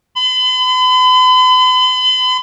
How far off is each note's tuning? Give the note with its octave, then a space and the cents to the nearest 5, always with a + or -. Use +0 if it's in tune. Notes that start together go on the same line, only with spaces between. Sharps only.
B5 +45